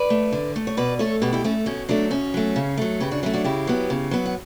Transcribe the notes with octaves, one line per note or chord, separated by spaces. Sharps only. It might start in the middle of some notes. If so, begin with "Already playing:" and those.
Already playing: B4 D5
A3
D3
A3
C#5
B2 B4 D5
A3 A4 C#5
B2 G4 B4
E4 G4
A3 C#4 E4
B2 C#4
F#3 A3 D4
B2 C#4
F#3 A3
C#3
F#3 A3
C#3 G4 B4
D4 F#4
F#3 A3 C#4 E4
D4 F#4
C#3 E4 G4
F#3 B3
C#3
F#3 B3
F#5